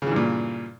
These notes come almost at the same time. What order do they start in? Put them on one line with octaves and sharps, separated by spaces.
C#3 E3 G2 A#2